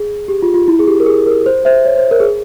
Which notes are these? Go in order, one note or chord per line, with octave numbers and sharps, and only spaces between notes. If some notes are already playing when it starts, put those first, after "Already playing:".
Already playing: G#4
G4
F4
F4
E4
G#4
G4
A#4
G#4
A#4
C5
C5 E5
C#5
C5
A#4
G#4